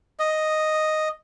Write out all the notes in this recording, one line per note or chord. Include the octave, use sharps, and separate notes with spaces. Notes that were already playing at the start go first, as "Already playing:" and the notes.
D#5